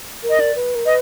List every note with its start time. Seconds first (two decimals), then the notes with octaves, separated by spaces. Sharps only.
0.24 A#4
0.29 D#5
0.40 D5
0.55 B4
0.75 A#4
0.85 B4 D#5